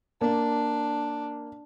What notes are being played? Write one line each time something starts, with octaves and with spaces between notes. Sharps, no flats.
A#3 D4